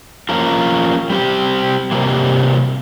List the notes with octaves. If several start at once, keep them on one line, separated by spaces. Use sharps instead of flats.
F3 A#3 C#4 F4 A#4
G3 C4 G4
C3 G3 A#3